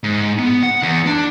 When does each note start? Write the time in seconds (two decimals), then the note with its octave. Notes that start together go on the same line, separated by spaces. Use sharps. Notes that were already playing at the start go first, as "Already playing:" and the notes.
0.04 G#2
0.39 B3
0.63 F#5
0.83 E2
1.06 D4